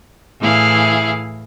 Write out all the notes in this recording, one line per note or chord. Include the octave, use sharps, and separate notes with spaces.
A2 E3 E4 G#4 F5